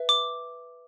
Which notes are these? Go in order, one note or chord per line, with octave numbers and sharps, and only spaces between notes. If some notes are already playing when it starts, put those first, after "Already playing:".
Already playing: B4 E5
D6